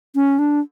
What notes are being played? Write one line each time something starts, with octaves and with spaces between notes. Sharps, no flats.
C#4
D4